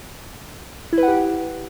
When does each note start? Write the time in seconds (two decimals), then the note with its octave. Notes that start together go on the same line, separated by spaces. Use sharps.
0.93 E4
0.98 B4
1.03 F#5
1.08 G4